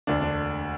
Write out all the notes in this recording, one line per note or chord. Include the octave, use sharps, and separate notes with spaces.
E1 D2 D3 D4
D4